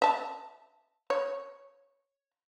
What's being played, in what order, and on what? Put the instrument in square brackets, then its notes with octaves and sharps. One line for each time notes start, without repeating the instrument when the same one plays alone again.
[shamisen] E5 A5
C#5